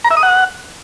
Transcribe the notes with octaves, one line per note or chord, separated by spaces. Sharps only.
A#5
E5
D#6
F#5